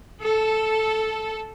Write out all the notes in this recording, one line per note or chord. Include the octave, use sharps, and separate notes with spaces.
A4